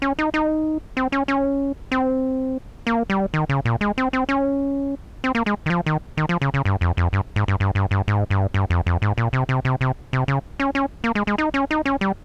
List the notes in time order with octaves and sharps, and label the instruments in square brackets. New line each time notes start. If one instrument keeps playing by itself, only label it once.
[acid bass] C#4
D#4
D#4
C4
C#4
C#4
C4
A#3
G3
D#3
C#3
A#2
G#3
C4
C4
C#4
C4
A#3
G#3
D#3
F3
D#3
D#3
F3
C#3
C#3
G2
F2
F2
G2
G#2
G2
G2
G2
G2
G#2
G2
G2
F2
F2
G#2
A#2
C3
C3
C3
C3
C3
C#3
C#4
C#4
A#3
G#3
G#3
D#4
C#4
D#4
C#4
G3